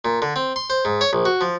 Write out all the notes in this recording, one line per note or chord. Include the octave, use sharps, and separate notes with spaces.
A#2
D3
C4
C6
C5
G#2
C#5
A#1
F#4
F3